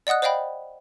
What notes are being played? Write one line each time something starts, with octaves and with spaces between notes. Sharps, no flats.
D5 D#5 F#5 D#6 F#6
C5 D5 D#5 F5 G5 B5